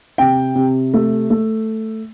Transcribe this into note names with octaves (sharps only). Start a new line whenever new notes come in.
C3 G5
C3
A3
A3